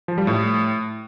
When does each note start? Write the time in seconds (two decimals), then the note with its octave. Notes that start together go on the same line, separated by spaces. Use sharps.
0.08 F3
0.18 G3
0.27 A2